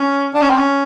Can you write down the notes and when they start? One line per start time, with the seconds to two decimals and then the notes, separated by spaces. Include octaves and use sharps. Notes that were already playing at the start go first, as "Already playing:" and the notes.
Already playing: C#4
0.34 D4
0.42 C#4
0.50 C4
0.57 C#4